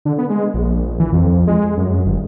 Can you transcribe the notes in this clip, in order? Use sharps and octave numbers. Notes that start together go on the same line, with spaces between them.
D3
B3
G#3
A#1
E3
F2
G#3
F#2
G1